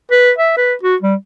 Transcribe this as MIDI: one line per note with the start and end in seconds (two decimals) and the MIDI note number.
0.11 0.31 71
0.39 0.53 76
0.57 0.74 71
0.83 0.96 66
1.02 1.15 55